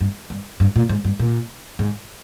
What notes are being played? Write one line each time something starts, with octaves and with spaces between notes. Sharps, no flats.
G2
G2
G2
A#2
G#2
G2
A#2
G#2